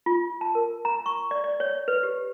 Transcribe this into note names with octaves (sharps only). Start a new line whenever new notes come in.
F4
A5
A#4
A#5
C#6
D5
D5
C#5
B4
G4